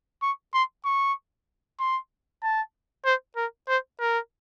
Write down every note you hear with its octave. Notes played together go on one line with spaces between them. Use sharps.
C#6
C6
C#6
C6
A5
C5
A#4
C5
A#4